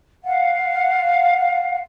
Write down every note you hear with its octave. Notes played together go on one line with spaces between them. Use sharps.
F5 F#5